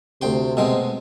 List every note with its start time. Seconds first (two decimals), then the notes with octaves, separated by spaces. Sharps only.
0.21 D2 C3 G5 C6
0.57 B2 G#3 C4